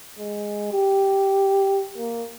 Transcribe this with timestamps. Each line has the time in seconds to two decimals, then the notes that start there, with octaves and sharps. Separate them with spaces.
0.19 G#3
0.72 G4
1.97 A#3